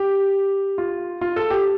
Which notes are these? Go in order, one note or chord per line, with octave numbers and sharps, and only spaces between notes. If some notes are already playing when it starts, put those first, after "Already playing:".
Already playing: G4
F4
F4
A4
G4